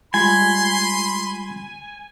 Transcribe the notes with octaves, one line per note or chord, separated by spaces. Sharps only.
G3 G#3 F4 G#5 B5 C6